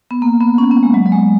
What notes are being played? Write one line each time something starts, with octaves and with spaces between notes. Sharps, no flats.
B3
A#3
B3
C#4
B3
G#3
F#3
F#3
G#3